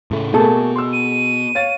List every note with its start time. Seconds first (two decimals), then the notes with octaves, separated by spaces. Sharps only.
0.11 A2 C#3 A3
0.34 B2 A3 A#3 G#4 A4 A5
0.76 C6 E6
0.93 D#7
1.55 C#5 F5 A6